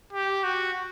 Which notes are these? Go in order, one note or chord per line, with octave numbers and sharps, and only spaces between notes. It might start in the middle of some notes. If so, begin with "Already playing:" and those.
G4
F#4